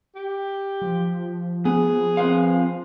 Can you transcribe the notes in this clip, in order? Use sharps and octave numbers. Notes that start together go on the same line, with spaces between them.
G4
F3
B3 G#4
C4 B4 F5